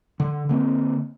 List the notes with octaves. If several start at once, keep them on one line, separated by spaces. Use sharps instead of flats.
D3
D3 A#3 C4